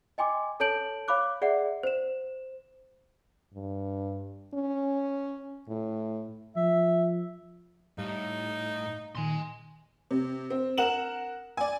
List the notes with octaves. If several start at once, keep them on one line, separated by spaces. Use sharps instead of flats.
D#5 G5 G#5 C6 D6
A4 C#5 A5 G6 D7 F#7
C#5 F5 B5 D6 F#6
G#4 D5 E5 F#5
C5 E7
G2
C#4
A2
F3 E5
A2 G3 D#4 F5
A#2 D#3 G#5 C6
C3
C4
A#4 F#5 E7 F#7
D5 G#5